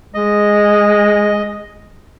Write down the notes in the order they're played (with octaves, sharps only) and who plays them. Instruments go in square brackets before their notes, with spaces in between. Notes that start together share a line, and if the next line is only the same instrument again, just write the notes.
[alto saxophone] G#3 [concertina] D#5